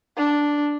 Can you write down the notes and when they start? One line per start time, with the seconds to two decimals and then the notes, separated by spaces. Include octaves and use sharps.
0.16 D4